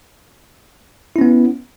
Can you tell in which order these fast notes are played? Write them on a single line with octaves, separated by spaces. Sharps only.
E4 C#4 B3